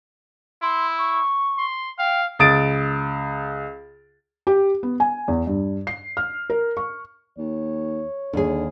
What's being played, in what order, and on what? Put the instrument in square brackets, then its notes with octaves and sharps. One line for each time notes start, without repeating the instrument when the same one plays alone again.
[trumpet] E4 [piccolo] C6
[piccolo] C#6
[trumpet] C6
[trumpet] F5 [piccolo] G5
[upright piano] C#2 D#6 A6 D7
[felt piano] G4
B3
G#5
E2
G2
C7
F6
A#4
C#6
[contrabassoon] D#2 [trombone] C#5
[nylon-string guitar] D#2 G#4 [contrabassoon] D3